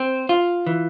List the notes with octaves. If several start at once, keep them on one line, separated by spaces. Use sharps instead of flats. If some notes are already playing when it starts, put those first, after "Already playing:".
Already playing: C4
F4
E3